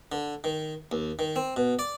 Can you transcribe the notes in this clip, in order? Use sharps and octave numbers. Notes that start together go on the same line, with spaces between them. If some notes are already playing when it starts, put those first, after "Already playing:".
D3
D#3
D#2
D#3
C4
B2
D5